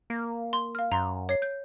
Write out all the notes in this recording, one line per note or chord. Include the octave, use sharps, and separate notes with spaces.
A#3
C6
F5 F6
F#2 A#5 C6
C#5 C7
G6